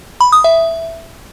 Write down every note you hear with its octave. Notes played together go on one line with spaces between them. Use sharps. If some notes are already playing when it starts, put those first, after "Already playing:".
B5
D#6
E5